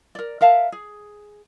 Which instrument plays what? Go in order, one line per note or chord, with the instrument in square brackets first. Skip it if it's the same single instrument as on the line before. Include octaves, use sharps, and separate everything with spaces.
[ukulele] A#4 D5
A#4 E5 F5 A5
G#4